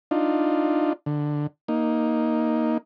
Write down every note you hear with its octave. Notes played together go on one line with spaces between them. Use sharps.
D4 D#4 F4
D3
A#3 D#4